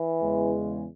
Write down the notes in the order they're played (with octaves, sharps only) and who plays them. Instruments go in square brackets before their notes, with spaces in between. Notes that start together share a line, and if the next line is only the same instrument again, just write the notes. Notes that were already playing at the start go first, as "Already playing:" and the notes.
Already playing: [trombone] E3
[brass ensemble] E2 C#3 G#3